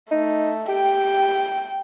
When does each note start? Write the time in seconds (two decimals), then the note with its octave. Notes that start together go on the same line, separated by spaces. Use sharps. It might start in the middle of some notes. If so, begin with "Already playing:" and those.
0.11 A3 D#4
0.68 G4 G5